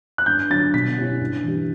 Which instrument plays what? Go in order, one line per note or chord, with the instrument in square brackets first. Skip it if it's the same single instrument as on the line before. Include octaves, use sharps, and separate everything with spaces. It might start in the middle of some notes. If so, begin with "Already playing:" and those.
[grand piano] F#6
G2 G6
D3 F#3 A6
B2 B6
G3 C#4 E4
G2
E3 G3